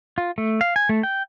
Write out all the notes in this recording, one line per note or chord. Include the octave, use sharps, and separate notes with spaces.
F4
A3
F5
G#5
A3
G5